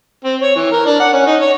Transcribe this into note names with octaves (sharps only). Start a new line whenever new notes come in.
C4
C#5
E3
A#4
D4
F#5
C#4
D#4
C#5